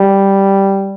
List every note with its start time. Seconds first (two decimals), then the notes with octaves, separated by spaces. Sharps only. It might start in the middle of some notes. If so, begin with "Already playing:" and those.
Already playing: G3